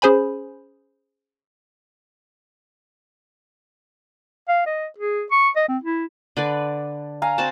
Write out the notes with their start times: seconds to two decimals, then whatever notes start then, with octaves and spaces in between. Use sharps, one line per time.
0.02 C#4 G#4 C5 G#5 B5
4.48 F5
4.66 D#5
4.98 G#4
5.31 C#6
5.56 D#5
5.69 C4
5.84 E4
6.37 D3 B4 D5
7.22 F5 G#5 A#5
7.38 C4 F#4 A5